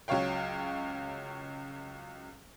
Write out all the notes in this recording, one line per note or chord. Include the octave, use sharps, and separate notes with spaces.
C#2 F#3 C#5 F5 G5